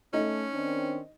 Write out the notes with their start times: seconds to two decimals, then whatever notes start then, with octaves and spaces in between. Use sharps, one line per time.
0.13 A3 C#4 D#4
0.54 D#3 C4 D4